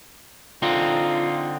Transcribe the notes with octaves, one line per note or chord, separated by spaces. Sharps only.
D3 C4 D#4 F4